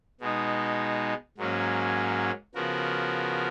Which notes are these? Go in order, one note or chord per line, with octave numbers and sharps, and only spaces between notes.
B2 G#3 D#4
G#2 F#3 A#3 C#4
C#3 F3 B3 F#4 A#4